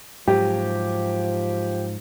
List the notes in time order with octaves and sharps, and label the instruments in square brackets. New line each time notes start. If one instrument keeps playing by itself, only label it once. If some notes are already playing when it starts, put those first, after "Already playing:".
[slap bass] G#2 F#3 [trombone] F3 [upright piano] G4